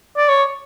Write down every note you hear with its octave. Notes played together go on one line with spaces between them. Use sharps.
D5
C#5